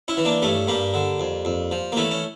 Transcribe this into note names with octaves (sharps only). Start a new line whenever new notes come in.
C#4 E4
E3
A#3 D4
G2 A3 C#4
G2 G3 A#3
D3
F2
F2
F3
A#3
E3 A3 C#4
C#4